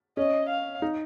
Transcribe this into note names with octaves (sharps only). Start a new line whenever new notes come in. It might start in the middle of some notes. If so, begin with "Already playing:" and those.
C#4 D#5
F5
D#4